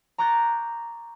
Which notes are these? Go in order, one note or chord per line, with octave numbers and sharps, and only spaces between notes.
A#5 C#6 D6 F#6 G6 A6